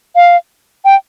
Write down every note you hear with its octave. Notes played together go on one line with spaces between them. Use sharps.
F5
G5